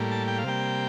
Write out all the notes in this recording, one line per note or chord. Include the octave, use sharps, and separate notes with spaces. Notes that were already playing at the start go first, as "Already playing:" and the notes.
Already playing: A2 G3 A#3
A5
G5
F5
C3 G3 A#3 G5